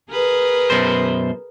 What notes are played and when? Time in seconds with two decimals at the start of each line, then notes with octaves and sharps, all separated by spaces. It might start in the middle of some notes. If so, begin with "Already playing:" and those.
0.11 G#4 A#4 B4
0.70 F#2 B2 C5